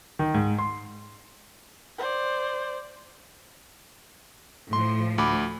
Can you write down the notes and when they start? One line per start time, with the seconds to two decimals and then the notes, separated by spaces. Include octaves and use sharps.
0.19 D#3
0.34 G#2
0.58 C6
1.98 C5 D5
4.73 A2 F3 C6
5.18 D2 B5 D6